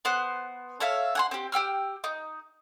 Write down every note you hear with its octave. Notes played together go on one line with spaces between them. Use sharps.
B3 C5 F#6
A4 C#5 E5 F5
F#5 G#5 C6
C4 G4
G4 G5 E6 F6
D#4